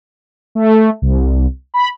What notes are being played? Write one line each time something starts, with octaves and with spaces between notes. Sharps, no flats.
A3
C2
B5